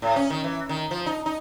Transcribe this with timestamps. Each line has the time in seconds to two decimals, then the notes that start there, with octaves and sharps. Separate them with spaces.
0.02 A2
0.16 C#4
0.30 D#3
0.44 E3
0.69 D#3
0.91 F3
1.06 D#4
1.26 D#4